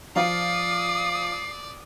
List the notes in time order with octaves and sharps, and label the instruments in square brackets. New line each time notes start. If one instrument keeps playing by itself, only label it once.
[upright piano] F3 F4 F5 [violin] D5 [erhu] D#6 [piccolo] C7